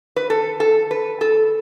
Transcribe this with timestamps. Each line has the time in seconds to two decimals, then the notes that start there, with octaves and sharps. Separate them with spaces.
0.16 B4
0.30 A4
0.60 A4
0.91 B4
1.21 A4